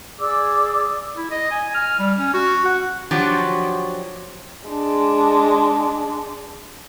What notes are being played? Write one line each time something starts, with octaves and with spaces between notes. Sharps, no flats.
G#4 D5 D6 E6
E4
D#5
G#5
F6
G3
C#4
F#4
F#5
F3 F#3 D4 F#4 G4
G#3 D4